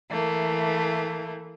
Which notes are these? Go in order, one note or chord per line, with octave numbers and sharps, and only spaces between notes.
E3 A3 A#3